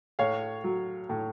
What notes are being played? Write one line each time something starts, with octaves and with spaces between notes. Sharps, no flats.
A2 C#5 F5
F#3
A2